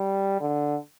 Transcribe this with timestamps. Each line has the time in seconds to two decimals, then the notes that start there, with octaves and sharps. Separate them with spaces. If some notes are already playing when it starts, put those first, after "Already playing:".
Already playing: G3
0.41 D3